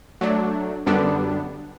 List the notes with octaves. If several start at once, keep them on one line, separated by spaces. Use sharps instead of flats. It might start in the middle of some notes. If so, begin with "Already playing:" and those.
F#3 A3 D4
F#2 D3 G3 B3 D4